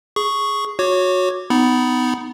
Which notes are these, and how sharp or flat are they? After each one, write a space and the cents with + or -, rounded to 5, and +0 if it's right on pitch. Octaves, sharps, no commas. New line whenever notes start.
G#4 +0 C#6 +0
F#4 -20 C#5 +0 D6 +0
B3 +20 D#4 +0 B5 -5